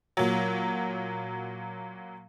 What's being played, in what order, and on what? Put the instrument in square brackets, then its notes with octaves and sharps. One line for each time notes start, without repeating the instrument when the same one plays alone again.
[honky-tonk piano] A#2 F#3